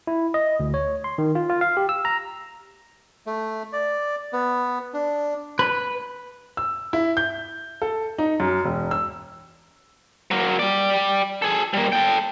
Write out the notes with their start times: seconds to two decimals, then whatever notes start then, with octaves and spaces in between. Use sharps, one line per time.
0.07 E4
0.34 D#5
0.60 D2
0.74 C#5
1.04 C6
1.18 D#3
1.35 F4
1.50 F4
1.61 F5
1.77 G4
1.89 E6
2.05 A#5
3.27 A3
3.73 D5
4.33 B3
4.94 D4
5.59 B4
6.57 E6
6.93 E4
7.17 G6
7.82 A4
8.18 D#4
8.40 F#2
8.65 E1
8.91 E6
10.31 F#3 A#3
10.59 G4 D5
11.42 G#4 A4
11.74 G3 A#3
11.92 A4 G5